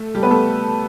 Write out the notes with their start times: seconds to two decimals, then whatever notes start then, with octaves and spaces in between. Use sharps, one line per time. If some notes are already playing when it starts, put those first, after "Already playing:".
Already playing: A3 A4
0.15 G3 G4
0.23 B3 B4
0.31 A3 A4